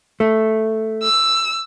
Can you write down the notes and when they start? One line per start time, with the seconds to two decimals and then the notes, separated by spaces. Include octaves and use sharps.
0.20 A3
1.03 E6